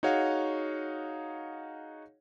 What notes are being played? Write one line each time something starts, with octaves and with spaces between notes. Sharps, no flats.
D#4 F#4 G#4 C#5 F5 F#5